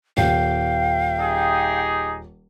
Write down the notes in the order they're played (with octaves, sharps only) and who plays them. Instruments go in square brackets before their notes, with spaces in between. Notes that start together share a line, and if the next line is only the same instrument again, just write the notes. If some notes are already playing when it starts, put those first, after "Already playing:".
[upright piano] D#1 [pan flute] F5 [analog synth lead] G5
[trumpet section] D#4 G4 G#4